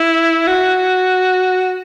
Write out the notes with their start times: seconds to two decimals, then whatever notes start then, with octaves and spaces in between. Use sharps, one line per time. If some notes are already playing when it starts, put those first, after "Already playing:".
Already playing: E4
0.47 F#4